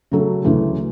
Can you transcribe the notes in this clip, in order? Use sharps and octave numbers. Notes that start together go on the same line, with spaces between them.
C#3 F#3 A3
D2 C#3 E3